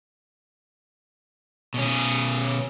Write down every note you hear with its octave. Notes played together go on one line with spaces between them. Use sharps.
B2 C#4